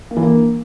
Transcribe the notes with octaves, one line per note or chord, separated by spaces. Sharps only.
A#3
E3
A#3